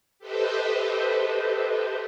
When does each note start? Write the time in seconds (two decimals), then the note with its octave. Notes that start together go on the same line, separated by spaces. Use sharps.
0.19 G4 A4 B4 C5 D#5 E5